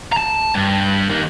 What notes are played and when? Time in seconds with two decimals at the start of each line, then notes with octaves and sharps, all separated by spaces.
0.12 A5 A#5
0.55 G2
1.09 D#3 A#3